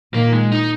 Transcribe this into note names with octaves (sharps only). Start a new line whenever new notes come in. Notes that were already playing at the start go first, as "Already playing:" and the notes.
A#2 D#3 A#3
G#3
D#4